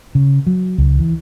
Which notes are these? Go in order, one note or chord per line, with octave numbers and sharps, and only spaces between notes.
C#3
F#3
C#2
E3